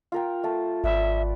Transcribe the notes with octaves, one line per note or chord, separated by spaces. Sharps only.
F4 A#4 G5
A3 A5
G#1 B4 D5 E5